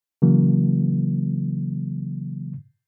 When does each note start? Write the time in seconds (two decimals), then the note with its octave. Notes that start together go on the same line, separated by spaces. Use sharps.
0.22 C#3 E3 F#3 A#3